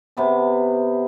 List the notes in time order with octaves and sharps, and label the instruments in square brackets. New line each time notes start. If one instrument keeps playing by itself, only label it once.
[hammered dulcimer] C3 B3 A5